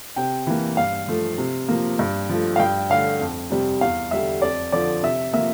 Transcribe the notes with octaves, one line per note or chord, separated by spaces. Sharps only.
C3 G5
E3 A#3
G2 F5
F3 A3
C3
F3 A#3
G2
F3 A3
F5
G2 G5
D3 A3 F5
F2
C3 G3
E2 F5
D3 G3 E5
F2 D5
D3 F3 D5
C3 E5
F3 A#3 E5